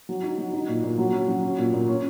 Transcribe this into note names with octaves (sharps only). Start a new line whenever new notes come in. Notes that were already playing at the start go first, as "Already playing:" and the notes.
F#3
D#4
F#3
D#4
A#2
A#2
F#3
C#4
F#3
C#4
A#2
A#2
C#4